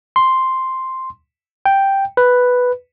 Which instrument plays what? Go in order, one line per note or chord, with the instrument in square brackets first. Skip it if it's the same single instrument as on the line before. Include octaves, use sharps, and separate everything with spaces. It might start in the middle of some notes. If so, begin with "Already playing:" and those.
[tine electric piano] C6
G5
B4